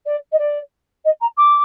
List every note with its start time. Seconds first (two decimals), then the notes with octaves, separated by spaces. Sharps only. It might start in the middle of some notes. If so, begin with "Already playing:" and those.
0.06 D5
0.32 D#5
0.38 D5
1.05 D#5
1.21 A#5
1.37 D6